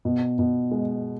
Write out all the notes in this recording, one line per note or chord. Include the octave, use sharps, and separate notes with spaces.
B2
B2
G#3